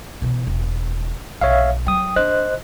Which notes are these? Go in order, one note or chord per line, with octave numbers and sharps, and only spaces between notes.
B2 E3
E1
B1 C#5 E5 F5
F#3 G5 D#6
D4 C5 D#5 F#6